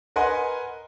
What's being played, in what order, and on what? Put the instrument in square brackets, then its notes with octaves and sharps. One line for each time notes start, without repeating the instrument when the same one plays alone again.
[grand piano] A#4 B4 D#5 F#5 G#5 C6